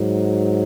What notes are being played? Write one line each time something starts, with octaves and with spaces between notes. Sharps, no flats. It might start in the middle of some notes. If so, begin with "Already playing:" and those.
Already playing: G#2 F#3